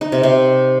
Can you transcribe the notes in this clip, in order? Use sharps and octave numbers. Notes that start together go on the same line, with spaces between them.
D#4
C3
C3